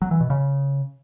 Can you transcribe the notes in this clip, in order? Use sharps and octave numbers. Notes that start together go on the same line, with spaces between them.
F#3
E3
B2
C#3